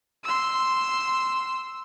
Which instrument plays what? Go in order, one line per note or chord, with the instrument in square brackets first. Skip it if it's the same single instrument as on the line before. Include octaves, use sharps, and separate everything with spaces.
[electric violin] C6 E6